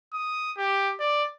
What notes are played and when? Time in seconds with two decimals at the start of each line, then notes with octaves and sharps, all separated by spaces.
0.13 D#6
0.57 G4
1.00 D5